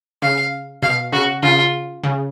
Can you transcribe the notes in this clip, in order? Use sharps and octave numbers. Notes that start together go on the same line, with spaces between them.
C#3 F5
B2 F5
C#3 F#4
C#3 F4
C#3